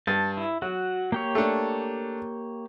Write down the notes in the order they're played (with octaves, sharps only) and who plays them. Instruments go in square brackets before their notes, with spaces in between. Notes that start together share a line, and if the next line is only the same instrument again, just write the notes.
[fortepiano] G2 [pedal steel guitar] A5
[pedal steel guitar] E4
[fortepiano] F#3 [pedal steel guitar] F#4
[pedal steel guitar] A#3 G4 C#5
[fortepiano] A3 D4